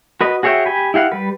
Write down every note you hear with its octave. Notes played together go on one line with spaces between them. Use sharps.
F#4 B4 D#5
F#4 G#4 C#5 E5 G5
G4 G#5 B5
E4 G4 F5 F#5
G3 B4